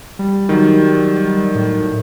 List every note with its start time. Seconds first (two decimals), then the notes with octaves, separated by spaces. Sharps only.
0.19 G3
0.49 D#3 F#3
1.55 A2